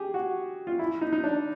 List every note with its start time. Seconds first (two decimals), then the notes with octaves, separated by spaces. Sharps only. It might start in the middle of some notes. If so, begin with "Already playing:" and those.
Already playing: G4 G#4
0.14 F#4
0.67 F4
0.79 E4
1.01 D#4
1.12 D#4
1.24 D4